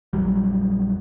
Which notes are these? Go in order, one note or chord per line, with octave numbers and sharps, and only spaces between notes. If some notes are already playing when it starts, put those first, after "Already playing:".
A#1 F2 F#3 G3